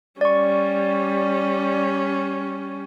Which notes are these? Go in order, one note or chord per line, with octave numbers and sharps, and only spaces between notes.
G3 C#4 D5 C#6